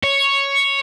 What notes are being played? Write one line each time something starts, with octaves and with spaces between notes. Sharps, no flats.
C#5